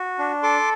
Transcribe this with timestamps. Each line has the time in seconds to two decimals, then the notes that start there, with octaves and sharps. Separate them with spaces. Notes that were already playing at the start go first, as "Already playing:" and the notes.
Already playing: F#4
0.19 D4
0.43 A4 C6 D6